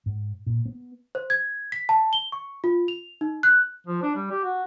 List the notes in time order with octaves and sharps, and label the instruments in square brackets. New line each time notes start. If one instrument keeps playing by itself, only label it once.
[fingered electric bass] G#2
A#2
B3
[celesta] C5
G#6
B6
A5
G7
C#6
F4
F7
D#4
F#6
[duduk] F3
D4
G3
G4
F#4